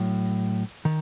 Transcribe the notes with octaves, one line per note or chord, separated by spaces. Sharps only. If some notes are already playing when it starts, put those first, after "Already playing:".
Already playing: A2 F#3
D#3